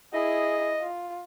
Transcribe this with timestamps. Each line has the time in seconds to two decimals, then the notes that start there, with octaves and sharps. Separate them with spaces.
0.13 E4 G#4 D#5
0.80 F4